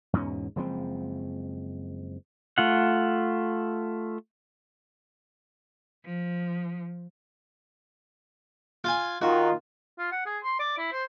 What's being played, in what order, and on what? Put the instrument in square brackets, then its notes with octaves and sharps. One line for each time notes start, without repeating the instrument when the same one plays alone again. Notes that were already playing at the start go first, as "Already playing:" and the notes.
[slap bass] E2 G#2 B2 C#4
F#1 F3 G#3 C4
[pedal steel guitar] A3 F4 F#5
[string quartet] F3
[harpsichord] F4 G#5
[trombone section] D#3 F4 [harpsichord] F#4
[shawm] F4
F#5
G#4
C6
D5
E4
C5